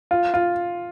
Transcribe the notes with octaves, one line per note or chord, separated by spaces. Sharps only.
F4
F4